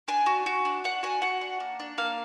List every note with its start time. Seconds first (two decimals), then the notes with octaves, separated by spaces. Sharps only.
0.08 D4 G#5
0.26 F#4
0.46 F#4
0.65 D4
0.84 D4 F#5
1.03 F#4 G#5
1.22 F#4 F#5
1.41 D4
1.60 A#3
1.80 D4
1.98 A#3 F5